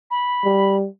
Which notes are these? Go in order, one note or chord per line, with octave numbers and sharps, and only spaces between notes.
B5
G3